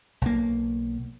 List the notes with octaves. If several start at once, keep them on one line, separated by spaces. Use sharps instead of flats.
B1 A#3